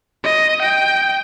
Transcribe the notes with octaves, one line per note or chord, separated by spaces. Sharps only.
D#5
G5